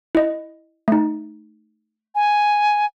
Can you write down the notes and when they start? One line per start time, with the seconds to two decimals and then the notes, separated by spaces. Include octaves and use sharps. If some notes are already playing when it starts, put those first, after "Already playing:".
0.15 E4 D#5
0.88 A3 D#4
2.15 G#5